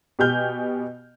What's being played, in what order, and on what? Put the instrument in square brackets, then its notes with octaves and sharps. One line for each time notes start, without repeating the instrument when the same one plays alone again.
[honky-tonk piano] B2 G4 G#5 F6 G6